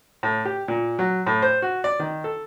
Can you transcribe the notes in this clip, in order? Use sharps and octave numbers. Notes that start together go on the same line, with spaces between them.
A2
G4
A#2
F#3
A2
C5
F#4
D5
D#3
A4